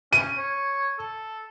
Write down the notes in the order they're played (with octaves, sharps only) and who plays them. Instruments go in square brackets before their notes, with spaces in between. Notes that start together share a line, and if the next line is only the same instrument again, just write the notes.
[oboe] C#4 [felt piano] D#7
[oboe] C#5
A4